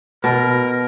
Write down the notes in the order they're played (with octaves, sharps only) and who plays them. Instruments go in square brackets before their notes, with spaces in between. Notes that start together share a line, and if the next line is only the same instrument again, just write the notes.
[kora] B2 [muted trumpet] A#4